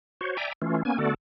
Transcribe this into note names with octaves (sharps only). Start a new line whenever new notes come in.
F#4 C5 C#5
D5 E5 G5 G#5 A#5
E3 A3 C#4 F4
A#3 B3 C#4 G#5
D3 A3 B3 F#4 A4 D5